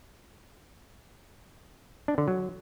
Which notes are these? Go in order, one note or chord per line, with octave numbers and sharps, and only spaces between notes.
D4
D3
F#3